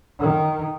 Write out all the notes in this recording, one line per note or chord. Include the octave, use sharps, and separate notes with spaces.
D#3